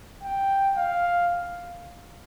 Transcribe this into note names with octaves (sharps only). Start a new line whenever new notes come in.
G5
F5